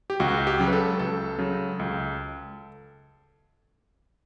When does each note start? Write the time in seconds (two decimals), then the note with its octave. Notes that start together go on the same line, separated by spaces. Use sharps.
0.10 G4
0.20 C#2 F#4
0.47 G4
0.59 C#3 F#3
0.68 B4
0.73 A4
0.99 C#2 A4
1.39 C#3 F#3
1.79 C#2